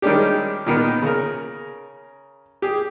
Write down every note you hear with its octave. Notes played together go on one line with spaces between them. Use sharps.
D#3 G3 G#3 C#4 D4 G4
A#2 D#3 B3
C#3 A#4
G4 G#4